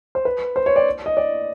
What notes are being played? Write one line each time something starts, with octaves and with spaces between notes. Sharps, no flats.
C5
B4
C5
C#5
D5
D#5
D5